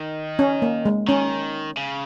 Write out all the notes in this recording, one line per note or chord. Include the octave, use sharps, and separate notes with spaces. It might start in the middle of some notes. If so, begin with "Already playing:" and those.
Already playing: D#3
C#4
A#3
G#3
D#3 C#4
C#3